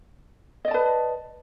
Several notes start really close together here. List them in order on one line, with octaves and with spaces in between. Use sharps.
D#5 D5 A5 B4